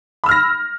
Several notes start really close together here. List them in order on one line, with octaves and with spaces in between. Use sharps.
B5 E6 F6 A#6